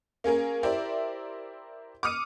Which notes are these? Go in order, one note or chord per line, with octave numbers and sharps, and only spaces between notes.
A#3 C#4 G#4 A#4
E4 G4 A#4 C5 D5 E5
D6 D#6 F6 C#7 D#7